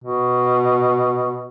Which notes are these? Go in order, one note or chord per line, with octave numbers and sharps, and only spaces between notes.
B2